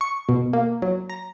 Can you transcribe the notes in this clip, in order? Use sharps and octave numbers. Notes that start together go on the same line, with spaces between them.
C#6
B2
A#3
F#3
A#5